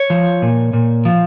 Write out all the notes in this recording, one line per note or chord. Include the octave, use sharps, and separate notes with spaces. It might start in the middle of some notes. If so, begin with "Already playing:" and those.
Already playing: C#5
F3
A#2
A#2
F3